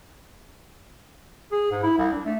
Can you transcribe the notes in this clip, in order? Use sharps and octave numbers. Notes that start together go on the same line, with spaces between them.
G#4
G#2
E4
C2
D4
A3